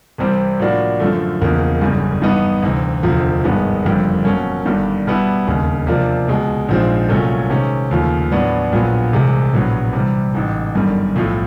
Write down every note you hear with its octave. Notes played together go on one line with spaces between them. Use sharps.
C2 C3 E3 G3 C4
A2 F3 A#3 D4 F#4
F#2 D3 F3 A3
E1 E2 C#3 F3 A#3
G1 F#2 C#3 E3 G3
G2 E3 G3 B3 D#4
D2 C3 E3
E1 D2 C3 F3
G#1 G2 D#3 G#3 B3
F#1 F2 D3 G3
B2 F#3 A#3 C#4
G1 G2 D#3 G3
B2 G3 B3 E4
E1 D#2 C#3
C3 F3 A#3 D4
C#2 B2 G#3
A#1 G#2 F3 G#3 C4
C2 A#2 F#3 A3 C#4
C3 D#3 G#3 C#4
D#2 C#3 F3 A3
A2 F#3 B3 D4
A#1 A#2 F#3 B3
C2 C3 E3 G#3
A#1 A2 F#3 B3
C3 E3 G3
A1 G#2 E3
G1 F#2 D#3 G3
B1 A2 F3 A3